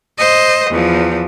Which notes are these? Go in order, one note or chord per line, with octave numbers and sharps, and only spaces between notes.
C5 D#5
E2 F3